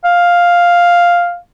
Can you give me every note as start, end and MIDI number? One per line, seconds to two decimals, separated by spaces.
0.04 1.37 77